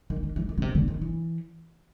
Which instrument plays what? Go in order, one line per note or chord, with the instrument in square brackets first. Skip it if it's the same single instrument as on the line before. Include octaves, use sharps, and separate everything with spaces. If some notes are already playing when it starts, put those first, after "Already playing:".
[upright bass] D#3
D#3
E3
D#3
C#3
C3
D3
D#3
E3